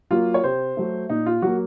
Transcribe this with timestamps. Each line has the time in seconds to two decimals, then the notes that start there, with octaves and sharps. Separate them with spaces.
0.11 F#3 A#3 F4
0.34 C#5
0.44 C3 C5
0.77 F#3 A3
1.09 A#2 D#4
1.26 F4
1.42 F#3 A#3 F#4